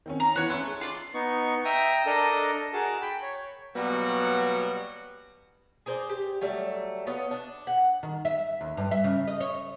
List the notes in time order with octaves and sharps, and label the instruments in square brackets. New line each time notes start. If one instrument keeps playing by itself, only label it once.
[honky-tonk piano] D#3 C4 C#4
[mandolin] A#5
[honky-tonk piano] E3 B3 F#5 [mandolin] C#5 F#6
[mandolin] A3 [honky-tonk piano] C#4 C6
[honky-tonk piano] G#4
[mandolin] F4 D5
[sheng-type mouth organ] B3 D#4 C#6
E5 G5 A#5 D#6
D4 A4 A#4 D#5
F#4 G#4 A#4 A5
G5 B5
C#5
[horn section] B2 F#3 G3 A#3 B3 F#4
[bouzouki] G#4 A#4 C5 D5
G4
F#3 G3 A3
B3 F4 C#5 D#5
D4
F#5
[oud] D#3
E5
D#2
G2
E5
C#3
D#5
C#5